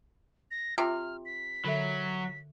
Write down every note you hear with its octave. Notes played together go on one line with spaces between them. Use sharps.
A#6
C3 F4 F6
B6
D3 F#3 A4 E5